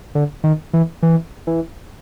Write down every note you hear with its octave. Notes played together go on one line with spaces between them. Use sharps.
D3
D#3
E3
E3
E3